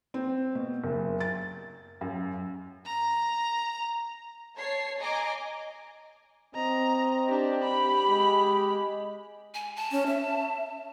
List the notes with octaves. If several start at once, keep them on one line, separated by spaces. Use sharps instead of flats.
C4
B2
F#1
A6
F#2
A#5
C#5 A5 C7
D#5 G#5 A#5 D6
C4 D#5 A#5
D4 G4
B5
G#3
G#5
A5
C#4
E5